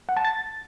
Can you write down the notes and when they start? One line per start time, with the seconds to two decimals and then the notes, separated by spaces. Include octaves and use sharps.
0.09 F#5
0.17 A5
0.25 A6